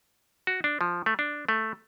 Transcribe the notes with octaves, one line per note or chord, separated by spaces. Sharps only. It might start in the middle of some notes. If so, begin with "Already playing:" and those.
F#4
D4
F3
A3
D4
A3